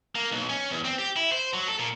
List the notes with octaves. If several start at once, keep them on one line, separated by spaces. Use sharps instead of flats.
A#3
B1
C#4
E2
C4
G4
E4
C5
F#3
A4
A#2